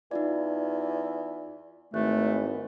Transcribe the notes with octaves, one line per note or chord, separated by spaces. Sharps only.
E2 D#4 F4 D5
G#1 E2 A3 F#6